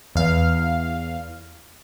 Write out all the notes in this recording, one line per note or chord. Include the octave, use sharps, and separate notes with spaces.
E2 F5